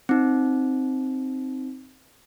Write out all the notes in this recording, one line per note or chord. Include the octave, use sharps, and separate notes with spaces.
C4 D#4